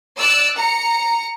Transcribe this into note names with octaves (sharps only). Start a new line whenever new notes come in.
D5 E6 F#6
A#5 C#7